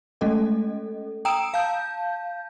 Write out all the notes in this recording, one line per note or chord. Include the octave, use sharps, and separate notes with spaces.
G#3 A3 C#4 A4 D#5
G5 A#5 D#6 E6 D7 E7
F5 A5 G6